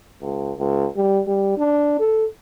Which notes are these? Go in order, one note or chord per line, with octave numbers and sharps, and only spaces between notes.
C#2
C#2
G3
G3
D4
A4